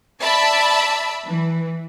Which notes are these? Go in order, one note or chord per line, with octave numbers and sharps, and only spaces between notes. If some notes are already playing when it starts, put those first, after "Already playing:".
D5 E5 A5 B5 E6
E3